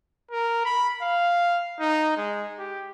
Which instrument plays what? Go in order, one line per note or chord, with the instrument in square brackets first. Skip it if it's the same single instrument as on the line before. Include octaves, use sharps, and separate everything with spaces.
[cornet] A#4
B5
F5
D#4
G#3
G4